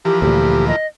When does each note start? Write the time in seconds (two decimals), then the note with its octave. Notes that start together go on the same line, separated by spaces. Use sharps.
0.05 E3 F3 G4 A#4
0.22 D2 A#2 G4
0.68 D#5